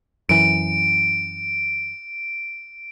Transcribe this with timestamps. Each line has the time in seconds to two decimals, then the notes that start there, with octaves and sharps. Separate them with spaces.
0.29 F#2 E3 D7